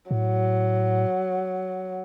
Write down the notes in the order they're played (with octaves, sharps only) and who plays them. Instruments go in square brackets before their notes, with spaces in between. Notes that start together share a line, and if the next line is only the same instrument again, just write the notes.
[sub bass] A2 [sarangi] F#3